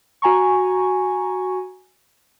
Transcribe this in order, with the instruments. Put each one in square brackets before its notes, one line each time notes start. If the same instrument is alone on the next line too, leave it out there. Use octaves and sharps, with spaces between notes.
[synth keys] F#4 G#5 A#5 C#6